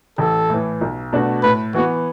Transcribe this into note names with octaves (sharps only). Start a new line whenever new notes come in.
A1 A4
A2 E3
B1
B2 A3 D4 F#4
A2 B4
E3 B3 F#4